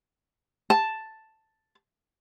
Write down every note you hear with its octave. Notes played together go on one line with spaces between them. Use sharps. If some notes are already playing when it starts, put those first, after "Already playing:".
A5